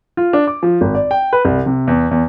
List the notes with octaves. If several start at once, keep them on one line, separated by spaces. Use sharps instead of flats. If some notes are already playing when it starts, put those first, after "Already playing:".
F4
D4
D6
F3
G#1
D5
G5
B4
C2
C3
E2
E2